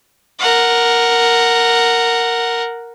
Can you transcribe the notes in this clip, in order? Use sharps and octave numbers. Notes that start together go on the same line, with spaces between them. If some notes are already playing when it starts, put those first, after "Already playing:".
A#4 F#5